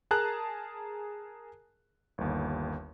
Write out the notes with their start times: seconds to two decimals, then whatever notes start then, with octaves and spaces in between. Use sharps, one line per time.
0.11 G#4 A#4 A5 A#5 F#6
2.18 G1 D#2